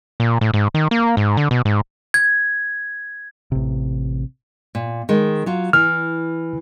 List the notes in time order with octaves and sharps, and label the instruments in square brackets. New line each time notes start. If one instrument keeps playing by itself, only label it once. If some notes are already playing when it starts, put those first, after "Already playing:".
[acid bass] A#2
A2
G#2
D#3
A#3
G#2
D3
B2
G#2
[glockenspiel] G#6
[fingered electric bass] A1 C3
[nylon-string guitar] A#2
D#3 G#3
F#3 F4
[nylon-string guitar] E3 [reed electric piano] F6